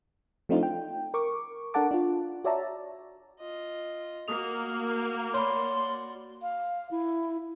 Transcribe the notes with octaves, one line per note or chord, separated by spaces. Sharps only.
F3 A3 C4 D4 D#4 F4
G5
A#4 C#6 D6
D4 A4 A#4 F#5 A5 D6
D4 F4
F#4 C#5 D5 E5 A5 A#5
F4 D#5
A#3 F#4 D#6 F7
F#4 C#5 D5 B5 C6
F5
E4